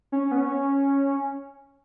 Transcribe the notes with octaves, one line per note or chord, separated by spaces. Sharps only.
C#4
B3
C#4